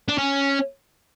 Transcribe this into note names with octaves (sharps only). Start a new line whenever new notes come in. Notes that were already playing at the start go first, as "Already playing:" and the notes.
D4
C#4